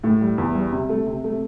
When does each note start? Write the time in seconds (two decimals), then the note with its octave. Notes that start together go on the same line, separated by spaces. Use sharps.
0.04 A2
0.21 G3
0.38 E2
0.55 G3
0.72 C3
0.89 A3
1.06 C3
1.24 A3